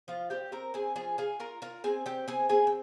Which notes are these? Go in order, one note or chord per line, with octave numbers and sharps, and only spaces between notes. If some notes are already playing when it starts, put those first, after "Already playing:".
F3 F4 F5
C4 G4 G5
C4 A#4 A#5
C4 G#4 G#5
F3 G#4 G#5
F4 G#4 G#5
F4 A#4 A#5
F4 A#4 A#5
C4 G#4 G#5
C4 G4 G5
C4 G#4 G#5
C4 G#4 G#5
G5